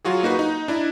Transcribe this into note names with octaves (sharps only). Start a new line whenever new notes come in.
F#3 F4 F#4 G#4
A#3 D#4 F#4 B4
D#4
D4 E4 D#5